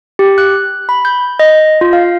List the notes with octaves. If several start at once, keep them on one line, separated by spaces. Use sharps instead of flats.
G4
F#6
B5
G6
D#5
F4
F5